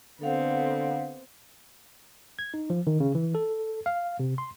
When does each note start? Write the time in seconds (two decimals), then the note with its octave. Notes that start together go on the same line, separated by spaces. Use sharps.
0.21 D3 B3 C4 A4 F5 F#5
2.39 G#6
2.54 D#4
2.70 F3
2.87 D#3
3.00 C#3
3.15 E3
3.35 A4
3.86 F5
4.20 C3
4.38 C6